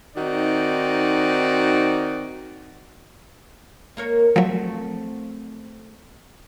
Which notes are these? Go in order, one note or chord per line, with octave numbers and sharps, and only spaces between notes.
D#3 C4 D#4 F#4 D5
A#3 A#4 C#5
F3 F#3 A3 C4